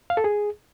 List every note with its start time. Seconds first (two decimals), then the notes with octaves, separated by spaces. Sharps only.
0.10 F5
0.17 A4
0.24 G#4